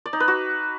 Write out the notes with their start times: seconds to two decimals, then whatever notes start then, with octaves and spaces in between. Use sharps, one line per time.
0.06 D5
0.13 D#4
0.20 B4
0.28 F#4